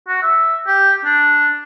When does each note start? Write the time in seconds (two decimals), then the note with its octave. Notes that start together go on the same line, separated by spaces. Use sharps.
0.08 F#4
0.23 E5
0.67 G4
1.05 D4